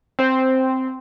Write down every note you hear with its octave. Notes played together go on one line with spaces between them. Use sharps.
C4 C5